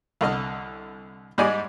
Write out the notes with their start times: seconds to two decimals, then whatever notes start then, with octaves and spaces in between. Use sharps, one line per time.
0.21 C2 D3 D#5 F6
1.38 G#2 G3 G#3 D#4 D5 G#5